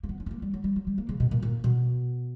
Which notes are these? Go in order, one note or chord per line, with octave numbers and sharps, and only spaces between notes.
A#3
B3
C#4
B3
A#3
G3
F#3
G3
F#3
G3
A#3
C#3
B2
A#2
A#2
B2